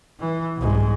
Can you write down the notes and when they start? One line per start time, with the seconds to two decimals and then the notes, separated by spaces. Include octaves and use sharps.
0.20 E3
0.57 C2 G#2